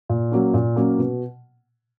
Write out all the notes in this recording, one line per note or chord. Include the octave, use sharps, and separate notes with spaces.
A#2
F#3 A#3 C#4
A#2
F#3 A#3 C#4
B2